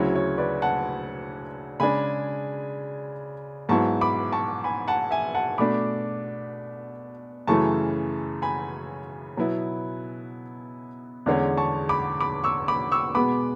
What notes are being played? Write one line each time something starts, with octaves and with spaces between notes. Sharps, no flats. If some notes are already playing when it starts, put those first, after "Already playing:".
Already playing: D2 C#3 F#3 C#4 E4 C#5
C#5
B4 D5
F#5 A5
C#3 G#3 D4 G#5 B5
G#2 F#3 B3 E4 A5 C#6
B5 D6
A5 C#6
G#5 B5
F#5 A5
E5 G#5
F#5 A5
B2 A3 D4 B5 D6
F#2 C#3 E3 A3 E4 A5 C#6
G#5 B5
B2 F#3 B3 E4
E2 D3 G#3 C#4
A5 C#6
B5 D6
B5 D6
C#6 E6
B5 D6
C#6 E6
B2 G#3 B3 B5 D6